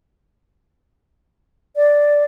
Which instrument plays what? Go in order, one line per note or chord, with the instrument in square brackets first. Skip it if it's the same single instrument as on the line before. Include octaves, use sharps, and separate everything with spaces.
[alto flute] D5